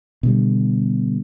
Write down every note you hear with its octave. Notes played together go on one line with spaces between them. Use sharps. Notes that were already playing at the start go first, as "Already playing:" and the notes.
B2 D3 G3